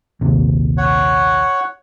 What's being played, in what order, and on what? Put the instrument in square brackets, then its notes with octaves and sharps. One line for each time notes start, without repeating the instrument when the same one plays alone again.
[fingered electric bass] A#1 D#2 C3
[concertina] C#5 F#5